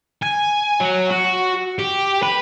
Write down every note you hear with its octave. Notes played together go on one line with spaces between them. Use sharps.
G#5
F#3
F#4
G4
B4